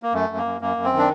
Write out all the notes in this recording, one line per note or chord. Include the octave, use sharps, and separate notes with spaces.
A#3
F#2 A3
F#2
A#3
F#2
F#2 A#3
F#2
C4
D#3
D4